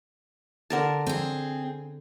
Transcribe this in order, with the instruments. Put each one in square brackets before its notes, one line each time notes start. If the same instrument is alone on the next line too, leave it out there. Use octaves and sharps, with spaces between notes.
[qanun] D3 A#4 A5
[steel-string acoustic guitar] C4 G#4